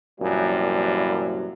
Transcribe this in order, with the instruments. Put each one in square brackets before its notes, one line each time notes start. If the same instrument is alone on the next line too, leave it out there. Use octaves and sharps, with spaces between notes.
[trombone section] C2 F#2 A#2 E3 F3 G3